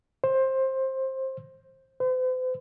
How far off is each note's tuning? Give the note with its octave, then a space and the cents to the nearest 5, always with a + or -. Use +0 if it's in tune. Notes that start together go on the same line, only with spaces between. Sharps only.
C5 +20
C5 -40